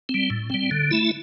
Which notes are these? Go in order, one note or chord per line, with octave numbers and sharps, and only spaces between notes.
C4
G3
A2
G3 C4
D3
A3 E4